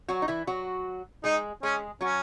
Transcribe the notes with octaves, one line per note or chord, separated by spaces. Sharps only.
F#3 F#4
D#4
E3 E4
F#3 F#4
G#3 D#4 G#4
G#3 C#4 G#4
F#3 C#4 F#4